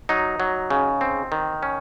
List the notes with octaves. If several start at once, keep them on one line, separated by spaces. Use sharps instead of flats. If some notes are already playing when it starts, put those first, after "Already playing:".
F#3 D#4
F#3
C#3
C4
D#3
C#4